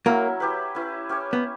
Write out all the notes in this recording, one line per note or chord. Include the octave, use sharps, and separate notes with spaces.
F#3 A#3 C#4 E4 A#4
E4 G4 B4
C#4 E4 B4
C#4 G4 C#5
B3